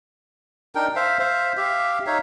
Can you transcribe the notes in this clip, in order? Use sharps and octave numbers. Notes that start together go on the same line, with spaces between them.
D4 D#4 A#4 G5
C5 E5 F5
C5 E5 F5
G4 E5 F5
D#4 C#5 E5 F5